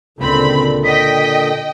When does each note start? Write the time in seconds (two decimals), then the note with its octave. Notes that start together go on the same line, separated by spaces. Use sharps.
0.19 C#2 A#2 D3 C4 B5
0.84 D#5 G5 B6